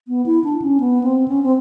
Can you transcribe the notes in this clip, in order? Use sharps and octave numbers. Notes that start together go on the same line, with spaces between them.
B3
E4
D4
C#4
B3
C4
C#4
C4